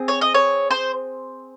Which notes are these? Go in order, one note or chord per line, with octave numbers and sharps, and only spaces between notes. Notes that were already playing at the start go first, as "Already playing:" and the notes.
Already playing: C4 G#4
C#5
D#5
C#5
C5